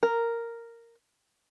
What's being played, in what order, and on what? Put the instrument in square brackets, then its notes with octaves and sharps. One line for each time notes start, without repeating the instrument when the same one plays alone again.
[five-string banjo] A#4